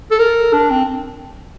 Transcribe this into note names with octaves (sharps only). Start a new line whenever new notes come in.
A4
A#4
D4
C4